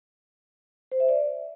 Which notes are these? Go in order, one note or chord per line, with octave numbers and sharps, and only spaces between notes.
C5
E5
D5